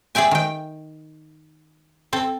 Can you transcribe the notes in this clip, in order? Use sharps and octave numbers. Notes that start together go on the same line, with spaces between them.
G#4 D5 E5 G5 G#5
D#3 G5
C4 A4